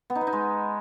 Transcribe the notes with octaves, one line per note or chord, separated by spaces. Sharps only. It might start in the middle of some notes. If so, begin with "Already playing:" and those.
B3
D#4
B3
D#4
G#3